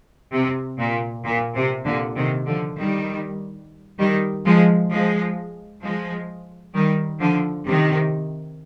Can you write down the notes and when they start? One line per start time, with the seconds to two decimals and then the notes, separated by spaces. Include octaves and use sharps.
0.32 C3
0.79 A#2
1.24 A#2
1.55 C3
1.85 A#2 D3
2.16 C3 D#3
2.47 D3 F3
2.77 D#3 G3
3.99 D#3 G3
4.45 F3 G#3
4.91 F3 G#3
5.82 F3 G#3
6.74 D#3 G3
7.20 D3 F3
7.66 C3 D#3